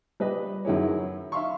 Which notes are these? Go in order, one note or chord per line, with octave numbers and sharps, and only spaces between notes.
G3 B4 D#5
F#2 D#3 E4 G#4 C#5
E5 F5 C6 C#6